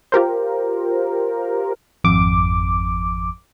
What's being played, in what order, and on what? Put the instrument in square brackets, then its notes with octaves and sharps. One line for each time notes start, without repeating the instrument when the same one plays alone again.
[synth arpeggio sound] F4 G4 A#4 C5
[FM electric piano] G#1 F2 D6